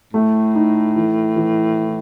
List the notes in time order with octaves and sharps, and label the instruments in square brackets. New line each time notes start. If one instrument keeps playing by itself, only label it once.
[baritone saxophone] A2 [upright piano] A3
[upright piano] D#4
E3
E3